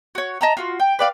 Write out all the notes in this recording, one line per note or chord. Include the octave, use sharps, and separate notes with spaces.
F#4 C#5
D#5 A5 A#5
F4 F#4
G5
B4 D5 F5